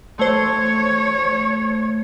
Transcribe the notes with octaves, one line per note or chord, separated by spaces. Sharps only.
A3 C5 C#5